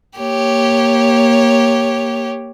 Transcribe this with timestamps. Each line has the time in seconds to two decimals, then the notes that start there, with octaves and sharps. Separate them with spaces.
0.19 A#3 G4 C#5